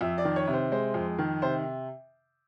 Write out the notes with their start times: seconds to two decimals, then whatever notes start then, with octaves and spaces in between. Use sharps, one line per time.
0.01 F2 E5
0.18 D5
0.25 D#3
0.36 C#5
0.47 C3
0.53 C5
0.71 G#3 C5
0.94 F2
1.18 D#3
1.42 C3 C5